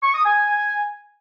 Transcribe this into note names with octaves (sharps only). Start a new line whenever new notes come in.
C#6
D#6
G#5